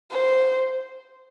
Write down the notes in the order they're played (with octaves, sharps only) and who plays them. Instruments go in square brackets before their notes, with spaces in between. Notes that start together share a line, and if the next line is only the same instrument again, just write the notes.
[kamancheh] C5